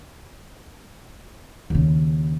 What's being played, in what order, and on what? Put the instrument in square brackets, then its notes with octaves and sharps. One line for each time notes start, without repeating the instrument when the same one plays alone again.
[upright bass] D#2 C#3